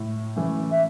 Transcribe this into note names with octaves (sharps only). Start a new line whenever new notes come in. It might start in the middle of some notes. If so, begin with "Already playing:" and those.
Already playing: A2
E3 A3 C#4 E4
E5